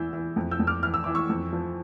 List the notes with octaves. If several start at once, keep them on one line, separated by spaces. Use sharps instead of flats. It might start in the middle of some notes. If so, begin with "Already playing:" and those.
Already playing: E2 E3 E6 G6
E3
F2
E6 G6
F2
D6 F6
E3 F6
E6
E3 D6
C#6 E6
F2
F3